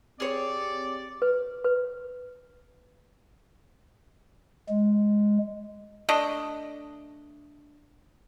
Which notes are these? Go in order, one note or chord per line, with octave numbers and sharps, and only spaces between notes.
C4 G4 G#4 C#5 D5
B4
B4
G#3
A3 D4 D#5